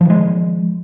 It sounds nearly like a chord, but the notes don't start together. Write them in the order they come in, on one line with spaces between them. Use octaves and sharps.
F3 D#3 G#3